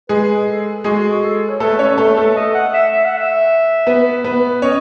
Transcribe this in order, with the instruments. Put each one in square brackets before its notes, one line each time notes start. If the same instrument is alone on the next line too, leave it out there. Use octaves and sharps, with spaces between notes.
[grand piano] G#3 G#4 [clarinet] B4
[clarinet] A4
[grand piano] G#3 G#4 [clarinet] F#4
[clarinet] A4
C#5
[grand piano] A3 A4 [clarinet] B4
[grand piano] C#4 C#5
A3 A4
A3 A4
[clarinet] D#5
F#5
E5
E5
F#5
E5
[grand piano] B3 B4
B3 B4
[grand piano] C#4 C#5 [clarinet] D#5